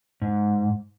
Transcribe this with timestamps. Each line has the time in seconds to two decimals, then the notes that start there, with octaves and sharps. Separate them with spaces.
0.22 G#2